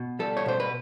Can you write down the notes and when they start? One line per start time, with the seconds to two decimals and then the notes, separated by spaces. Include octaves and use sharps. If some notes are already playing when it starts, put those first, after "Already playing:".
Already playing: B2
0.19 G3 A4
0.37 C#5
0.46 B2 C5
0.60 B4